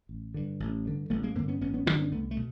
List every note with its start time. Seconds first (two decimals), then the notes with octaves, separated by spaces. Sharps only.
0.09 A1
0.34 G2 D3
0.60 A1
0.85 G2 D3
1.10 A1 A3 B3
1.23 G#3 A#3
1.35 G2 D3 A#3 C4
1.48 B3 C#4
1.61 A1 B3 C#4
1.74 B3 C#4
1.86 G2 C4 D4
1.91 D3
1.99 B3 C#4
2.12 C2 A3 B3
2.31 A3
2.37 B2